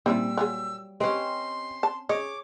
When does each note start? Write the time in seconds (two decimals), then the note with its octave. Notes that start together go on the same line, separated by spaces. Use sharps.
0.06 A#2 G3 C4 E4 F4 E6
0.37 F#3 F4 G#4
1.00 C4 C#4 G4 B4 D#5 C6
1.83 A5
2.09 G#4 C#5 D#5 D6